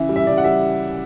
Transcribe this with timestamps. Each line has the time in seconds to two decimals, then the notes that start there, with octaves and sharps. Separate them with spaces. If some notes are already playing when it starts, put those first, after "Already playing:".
Already playing: C#3 E3 E5
0.09 G3
0.16 E5
0.27 C#3 D5
0.37 F#5
0.44 G3 E5